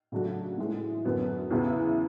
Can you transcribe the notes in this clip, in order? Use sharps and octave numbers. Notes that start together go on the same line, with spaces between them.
C#3 F#3 A3 D4 F#4
A2 E3 G#3
F#2 D3 F#3 B3
E2 C#3 E3 B3 E4